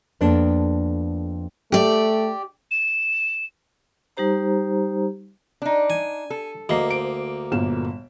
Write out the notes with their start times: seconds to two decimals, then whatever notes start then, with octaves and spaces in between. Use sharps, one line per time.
0.21 F2 A#3 B3 D4 A4
1.72 A3 G4 D5
2.71 E7
4.17 G3 D#4 G4 C5 A#5
5.62 D4 D#4
5.90 G#5
6.30 A4
6.69 D2 A#3 A#4 D#5 C7
6.90 C5 D7
7.52 G1 A#2 E7